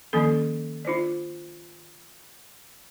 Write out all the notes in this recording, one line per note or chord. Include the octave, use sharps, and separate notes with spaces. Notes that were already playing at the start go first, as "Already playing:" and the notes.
D#3 F3 A#3 C#4 A4
D4 F4 C5 D5